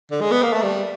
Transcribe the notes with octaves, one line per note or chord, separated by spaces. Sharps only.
D3
G#3
B3
A#3
A3
G3